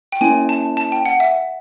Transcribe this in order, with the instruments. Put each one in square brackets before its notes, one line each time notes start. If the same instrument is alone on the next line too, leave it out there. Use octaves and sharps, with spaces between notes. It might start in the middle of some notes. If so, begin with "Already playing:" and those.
[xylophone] G5
[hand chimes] A#3 C#4 E4 [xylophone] G#5
[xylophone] A5
A5
G5
F#5
E5